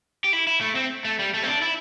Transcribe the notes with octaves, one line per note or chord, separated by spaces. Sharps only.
G4
E4
E4
A3
C4
A3
G3
A3
C4
D4
E4